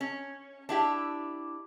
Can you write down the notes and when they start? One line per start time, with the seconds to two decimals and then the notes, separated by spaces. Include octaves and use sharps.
0.01 C#4
0.69 D4 E4 G4